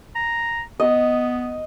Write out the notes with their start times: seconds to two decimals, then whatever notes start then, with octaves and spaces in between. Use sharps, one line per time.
0.16 A#5
0.80 B3 D#5